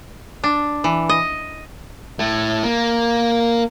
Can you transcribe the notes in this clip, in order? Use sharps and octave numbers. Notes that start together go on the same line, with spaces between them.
D4
E3
D#5
A2 A3
A#3